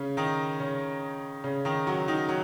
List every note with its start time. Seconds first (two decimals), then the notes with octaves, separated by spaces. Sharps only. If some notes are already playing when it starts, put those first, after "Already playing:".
Already playing: C#3 C#4
0.17 D#3 D#4
0.60 C#3 C#4
1.44 C#3 C#4
1.65 D#3 D#4
1.87 F#3 F#4
2.08 D#3 D#4
2.29 F#3